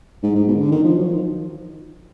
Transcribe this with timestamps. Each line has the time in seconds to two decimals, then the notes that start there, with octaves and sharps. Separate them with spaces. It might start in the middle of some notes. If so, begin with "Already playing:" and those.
0.23 G#2
0.35 G#2
0.48 B2
0.55 D#3
0.60 D3
0.72 D#3
0.84 F3
0.96 F#3
1.05 F3
1.14 D#3